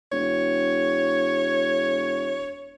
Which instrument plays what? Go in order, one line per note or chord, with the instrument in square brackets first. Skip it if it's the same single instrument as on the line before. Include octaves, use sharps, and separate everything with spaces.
[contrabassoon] E1 [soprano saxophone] C#5